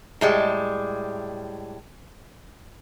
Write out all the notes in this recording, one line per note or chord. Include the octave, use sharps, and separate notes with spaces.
A2 G3 G#3